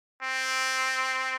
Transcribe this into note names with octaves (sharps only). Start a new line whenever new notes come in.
C4